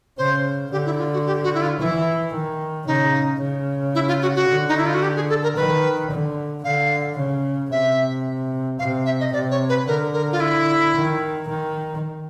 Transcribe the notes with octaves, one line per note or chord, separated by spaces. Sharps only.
C#3 C5
D3 G4
E4
F4
F#4
G4
F#4
E4
F4
E3 E4
D#3
C#3 D#4
C#3
E4
F4
F#4
F#4
D3
D#4
E4
F4
F#4
G4
G#4
A4
A#4
D#3 B4
D3
D3 F5
C#3
C3 E5
C3 F5
E5
D#5
C3 D5
C#5
B4
D3 A#4
A#4
F4
E4
D#3
D#3